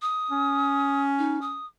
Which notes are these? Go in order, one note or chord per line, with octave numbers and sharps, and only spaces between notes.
D#6
C#4
D#4
D#6